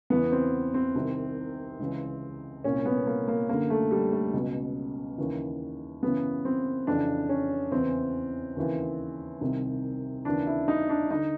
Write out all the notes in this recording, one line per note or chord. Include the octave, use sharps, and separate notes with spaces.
E2 C#3 E3 B3
C4
C4
C2 C3 D#3
C#2 C#3 E3
C2 A#2 C#4
B3
A#3
A#3
F#2 D3 A#3
A3
G3
A3
C#2 B2
D#2 C#3 E3
F#2 C#3 E3 B3
C4
F2 C#3 E3 D4
C#4
E2 C#3 E3 C4
D#2 C#3 E3
C2 C3 D#3
D#2 C#3 E3 D4
E4
D#4
D4
D3 D#4